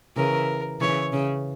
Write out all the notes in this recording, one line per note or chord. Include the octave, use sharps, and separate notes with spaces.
C#3 E3 A#4
C#3 E3 C#5
C#3